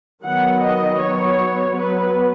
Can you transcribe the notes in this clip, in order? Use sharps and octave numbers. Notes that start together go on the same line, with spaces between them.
D#3 F#3 B3 F#5
D#5
F#3 B3 C#5
F#3 B3 B4